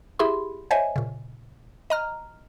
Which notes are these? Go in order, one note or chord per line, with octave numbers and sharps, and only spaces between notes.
E4 G4 G#4 E5 B5 C6
C5 C#5 D#5 E5 G#5
A#2 C#3
D#5 A#5 F6